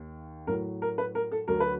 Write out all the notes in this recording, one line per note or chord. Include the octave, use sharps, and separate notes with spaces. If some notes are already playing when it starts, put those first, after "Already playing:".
Already playing: D#2 D#3
A2 F#3 A#4
A#4
B4
A#4
A4
D2 D3 F#3 A#4
B4